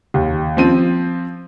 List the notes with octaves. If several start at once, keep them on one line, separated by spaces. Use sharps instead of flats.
D#2
F3 C4 D#7